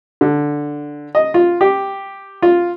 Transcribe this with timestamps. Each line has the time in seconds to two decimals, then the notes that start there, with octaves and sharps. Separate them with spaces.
0.21 D3
1.15 D#5
1.34 F4
1.61 G4
2.42 F4